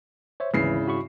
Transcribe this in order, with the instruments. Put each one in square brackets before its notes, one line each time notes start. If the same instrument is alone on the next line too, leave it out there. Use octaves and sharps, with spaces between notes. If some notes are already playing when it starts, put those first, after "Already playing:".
[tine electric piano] C5 C#5 E5
[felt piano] G#1 E4 C7 [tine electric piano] D2 E3 [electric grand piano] C#3
[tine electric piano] F#4 B5 C#6